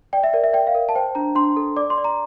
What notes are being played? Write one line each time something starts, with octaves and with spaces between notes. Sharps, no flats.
D5 G5
E5
A#4 D5
E5
D5 G5
F5
A#4
A5
C5 G5
D4 A#5
D4 C6
A4
D5 D6
C6
D5
A#5